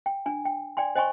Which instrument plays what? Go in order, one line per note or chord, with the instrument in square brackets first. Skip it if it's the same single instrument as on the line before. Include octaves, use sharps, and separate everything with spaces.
[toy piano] G5
D4 G#5
G5
D5 G5 G#5 C6
C5 D#5 G5 G#5 C6 C#6